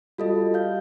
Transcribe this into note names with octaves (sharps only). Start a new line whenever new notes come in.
G3 F4 F#4 A4 D#5
F5 G6